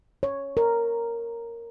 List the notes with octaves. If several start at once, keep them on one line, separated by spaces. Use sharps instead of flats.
C#5
A#4